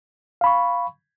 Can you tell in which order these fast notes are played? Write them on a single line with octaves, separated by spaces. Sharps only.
F5 B5 C#6